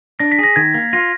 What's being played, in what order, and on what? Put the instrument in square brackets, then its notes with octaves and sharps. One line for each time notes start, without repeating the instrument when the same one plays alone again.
[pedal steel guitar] D4 [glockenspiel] A#6
[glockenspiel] B6
[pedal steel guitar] G#4 [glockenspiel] A#6
[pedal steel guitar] D#3 [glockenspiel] G#6
[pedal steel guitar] A#3
[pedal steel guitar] F4 [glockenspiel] A#6